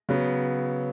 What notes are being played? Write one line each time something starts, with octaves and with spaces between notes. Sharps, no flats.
C#3 F#3 B3